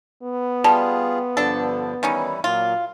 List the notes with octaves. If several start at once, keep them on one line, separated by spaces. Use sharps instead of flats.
B3
G3 F4 G#4 A5
G2 D3 F3 D4 A4
D#3 E3 G3 C#4 D#4 E4
A#2 F#3 A#3 F4